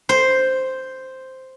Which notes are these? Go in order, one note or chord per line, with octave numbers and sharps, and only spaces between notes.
C5